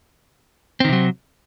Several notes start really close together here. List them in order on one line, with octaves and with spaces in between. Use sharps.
C4 D#3 C3 F#3